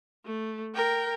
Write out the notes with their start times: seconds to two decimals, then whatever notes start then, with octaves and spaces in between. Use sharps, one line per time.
0.25 A3
0.75 A#4 G5